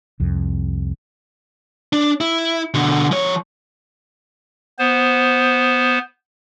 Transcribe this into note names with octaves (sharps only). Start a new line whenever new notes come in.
C2 F2
D4
E4
B2 D3
F3 C#5
B3 C5